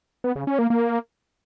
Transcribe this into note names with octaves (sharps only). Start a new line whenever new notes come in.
B3
C#3
C#4
A#3
A#3